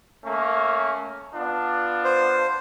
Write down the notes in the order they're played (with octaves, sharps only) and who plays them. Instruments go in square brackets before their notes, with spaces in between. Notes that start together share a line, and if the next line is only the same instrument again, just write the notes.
[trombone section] A3 A#3 C#4
B3 D4 F4
[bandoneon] C5